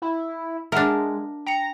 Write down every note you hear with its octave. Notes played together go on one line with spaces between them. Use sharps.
E4
G#3 D4 A#4 E5 F#5 A5
G5 A#5 C#7